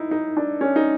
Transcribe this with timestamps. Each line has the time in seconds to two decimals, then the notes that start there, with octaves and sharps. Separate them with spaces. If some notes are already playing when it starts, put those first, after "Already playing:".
Already playing: D#4 E4
0.11 D#4
0.37 D4
0.61 C#4
0.76 D#4